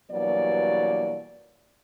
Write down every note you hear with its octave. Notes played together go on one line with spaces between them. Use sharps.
G2 B2 E3 F#3 A#3 D5